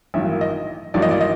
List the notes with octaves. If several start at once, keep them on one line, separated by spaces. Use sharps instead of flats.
A1 G2 D#3 F#3 A#3 E5
D#5
A1 G2 D#3 F#3 A#3 D5
D#5
D5
D#5